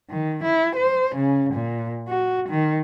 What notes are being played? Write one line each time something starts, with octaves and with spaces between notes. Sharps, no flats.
D#3
E4
C5
C#3
A#2
F#4
D#3